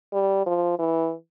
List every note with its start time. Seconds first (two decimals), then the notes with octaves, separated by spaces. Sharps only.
0.13 G3
0.46 F3
0.79 E3